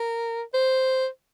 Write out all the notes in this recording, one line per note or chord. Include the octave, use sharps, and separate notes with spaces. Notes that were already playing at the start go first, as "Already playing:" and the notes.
Already playing: A#4
C5